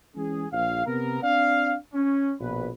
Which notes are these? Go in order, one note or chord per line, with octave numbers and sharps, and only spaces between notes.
E3 G#3 C#4 G#4
A#1 F5
C3 B3 A#4
C4 D4 D5 F5
C#4
A#1 B2 B4